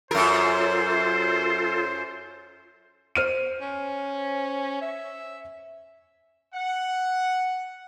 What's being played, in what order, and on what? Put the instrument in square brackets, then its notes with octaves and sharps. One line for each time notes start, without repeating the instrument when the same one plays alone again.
[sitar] F#2 A#4 [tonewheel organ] F4 A4 [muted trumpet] C5
[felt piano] C5 F6 D#7
[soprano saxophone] C#4
E5
[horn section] F#5